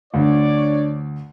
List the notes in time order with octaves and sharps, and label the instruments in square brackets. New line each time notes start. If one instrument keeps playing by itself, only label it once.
[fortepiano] D2 [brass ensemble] D4 C#5 D5